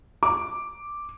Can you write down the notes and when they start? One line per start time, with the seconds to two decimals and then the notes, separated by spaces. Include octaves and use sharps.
0.23 D6